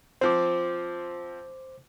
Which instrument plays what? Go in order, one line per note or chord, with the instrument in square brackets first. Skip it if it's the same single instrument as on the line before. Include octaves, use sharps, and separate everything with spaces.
[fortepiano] F3 C4 [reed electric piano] C5 D6